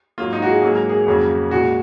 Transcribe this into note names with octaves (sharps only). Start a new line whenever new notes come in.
G#2 F#3 A#3 F4
D#4
F#4
G#4
G#2 F#3 A#3 G#4
A#4
G#4
F2 C#3 F#3 A#3
A#2 G#3 F#4